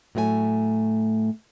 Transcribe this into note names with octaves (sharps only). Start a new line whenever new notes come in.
A2 F#3 A3 A#4 G#5